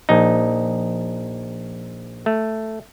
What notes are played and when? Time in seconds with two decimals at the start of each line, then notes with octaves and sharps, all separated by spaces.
0.09 A#1 D#4
2.26 A3